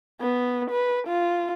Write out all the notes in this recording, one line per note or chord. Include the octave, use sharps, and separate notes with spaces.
B3
B4
F4